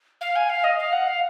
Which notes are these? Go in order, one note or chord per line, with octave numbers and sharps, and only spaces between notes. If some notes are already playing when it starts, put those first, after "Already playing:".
F5
G#5
F5
D#5
F5
F#5
F5